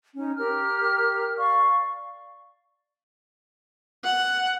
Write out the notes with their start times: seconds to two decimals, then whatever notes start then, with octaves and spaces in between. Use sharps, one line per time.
0.15 C#4 D#4
0.37 G4 A#4 A#5 F6
1.38 D5 F5 C#6
4.04 F#5